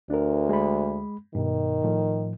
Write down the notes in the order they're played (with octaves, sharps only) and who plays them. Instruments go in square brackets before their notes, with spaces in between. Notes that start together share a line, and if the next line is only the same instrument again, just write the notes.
[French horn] D2 [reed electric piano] D4 A#4
[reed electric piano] G#3 B5
[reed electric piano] G2 B2 [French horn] D#3
[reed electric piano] A2 F3